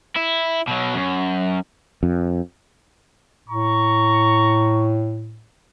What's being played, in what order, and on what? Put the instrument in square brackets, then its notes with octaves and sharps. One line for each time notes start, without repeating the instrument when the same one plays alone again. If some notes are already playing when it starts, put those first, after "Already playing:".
[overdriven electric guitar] E4
B2 F#3
F#2
[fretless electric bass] F2
[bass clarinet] A2 [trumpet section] A#5 C#6